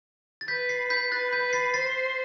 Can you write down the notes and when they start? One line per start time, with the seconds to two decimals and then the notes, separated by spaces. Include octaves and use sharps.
0.41 A6
0.48 B4 G6 B6
0.69 A6 C7
0.90 G6 B6
1.11 B4 F#6 A6
1.32 G6 B6
1.42 B4
1.53 A6 C7
1.74 C5 A6 C7